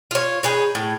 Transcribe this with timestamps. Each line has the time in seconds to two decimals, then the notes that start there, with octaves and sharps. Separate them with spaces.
0.11 F4 C#5
0.43 D#4 G#4 B4 C#5
0.75 A2